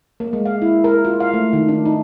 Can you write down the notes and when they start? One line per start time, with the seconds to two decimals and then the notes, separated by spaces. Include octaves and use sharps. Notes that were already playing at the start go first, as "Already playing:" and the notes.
0.20 A#3
0.33 G#3
0.45 F5
0.62 E4
0.84 A#4
1.05 F4
1.20 F5
1.34 A3
1.53 D#3
1.68 D4
1.85 D#4